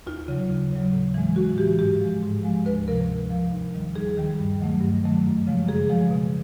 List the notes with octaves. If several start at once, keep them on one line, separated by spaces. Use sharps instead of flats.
D#2 F4
C#3 F#3
D#2
C#3 F#3
A2
E3 G#3
A2 F#4
E3 G#3 G4
G#2 G4
F3 G#3
G#2
F3 G#3
D2 B4
C3 F3 A#4
D2
C3 F3
D#2
D#3 G3
D#2 G#4
D#3 G3
G2
D#3 F#3 A3
G2
D#3 F#3 A3
F#2
C#3 F3 G#3
F#2 G#4
C#3 F3 G#3
B2